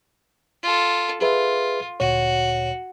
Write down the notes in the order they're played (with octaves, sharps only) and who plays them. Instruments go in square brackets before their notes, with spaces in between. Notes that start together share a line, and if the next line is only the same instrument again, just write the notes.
[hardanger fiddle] F4 A4
[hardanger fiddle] F4 [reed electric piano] G#4 B4 E5
[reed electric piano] D2 A#2 C#5 [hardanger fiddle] F#4